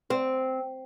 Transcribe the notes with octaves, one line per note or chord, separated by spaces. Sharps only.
C4